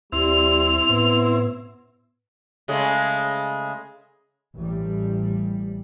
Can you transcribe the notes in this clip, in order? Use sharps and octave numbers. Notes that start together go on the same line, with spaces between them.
D#2 G3 C4 E4 F7
A2 B3
C#3 G#3 A3
A1 G3